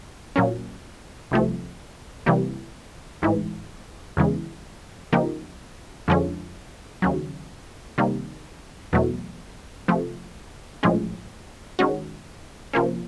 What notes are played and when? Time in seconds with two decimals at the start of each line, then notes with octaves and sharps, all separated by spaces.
0.36 A#2 F#3 A#3 C#4
1.31 C2 C3 F3 A3
2.26 C3 E3 G3 A#3
3.22 A1 G#2 E3
4.17 E2 C#3 E3 G#3
5.13 C#3 F3 A#3 D#4 G4
6.08 F2 D3 F3 G#3 C#4
7.02 D#2 C#3 F#3
7.98 C3 D#3 G3 A#3
8.93 E2 B2 F#3 A3
9.88 C3 F3 A3
10.83 A#1 A2 F3 G#3 C#4
11.79 D#3 G#3 C#4 F#4
12.73 C3 F3 A#3 C#4